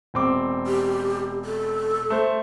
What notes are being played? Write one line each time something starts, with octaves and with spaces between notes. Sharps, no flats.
E1 C4 D6
G4
A4
A3 C5